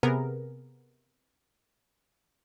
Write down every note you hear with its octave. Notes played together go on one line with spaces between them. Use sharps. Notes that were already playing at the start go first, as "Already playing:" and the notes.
C3 B3 G#4 A#4